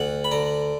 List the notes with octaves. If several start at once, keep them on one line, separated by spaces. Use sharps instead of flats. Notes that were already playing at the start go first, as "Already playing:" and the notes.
Already playing: D2 F#5
B5
D3 A#5